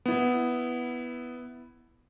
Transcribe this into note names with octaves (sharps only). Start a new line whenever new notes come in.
B3 E4